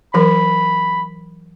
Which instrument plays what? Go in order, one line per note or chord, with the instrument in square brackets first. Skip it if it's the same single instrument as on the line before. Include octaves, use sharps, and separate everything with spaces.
[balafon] E3 F#3 A#4 [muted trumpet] B5